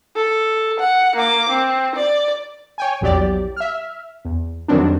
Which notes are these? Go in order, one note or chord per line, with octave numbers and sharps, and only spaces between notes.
A4
F#5
A#3 D6
C4
D5
C#5 G5 G#5
A#1 E2 F#3 G4 D5
E5 F6
E2
F2 D#3 F#3 G3 C4 D4